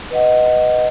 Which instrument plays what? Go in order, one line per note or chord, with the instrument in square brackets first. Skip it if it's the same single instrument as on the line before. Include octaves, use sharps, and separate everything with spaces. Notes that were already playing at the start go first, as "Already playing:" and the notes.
[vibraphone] B4 D#5 F#5